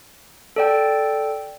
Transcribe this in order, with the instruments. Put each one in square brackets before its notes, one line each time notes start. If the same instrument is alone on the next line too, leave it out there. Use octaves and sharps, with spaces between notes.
[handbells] A4 D5 G5